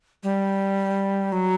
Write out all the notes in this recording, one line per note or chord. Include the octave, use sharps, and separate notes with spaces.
G3
F#3